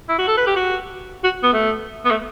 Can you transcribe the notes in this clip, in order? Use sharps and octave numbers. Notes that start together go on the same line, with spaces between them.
E4
F#4
A4
B4
G4
F#4
F#4
B3
A3
B3
A3